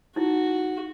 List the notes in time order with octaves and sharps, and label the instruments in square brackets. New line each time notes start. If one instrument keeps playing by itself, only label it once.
[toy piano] D#4 E4 [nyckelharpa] F#4